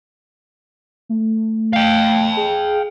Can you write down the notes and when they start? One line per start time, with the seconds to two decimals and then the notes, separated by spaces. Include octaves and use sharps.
1.09 A3
1.73 F5 G5
2.37 G#4